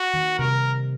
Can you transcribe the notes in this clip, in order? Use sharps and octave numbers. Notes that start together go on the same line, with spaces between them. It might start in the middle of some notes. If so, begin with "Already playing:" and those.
Already playing: F#4
D#3
C3 A#4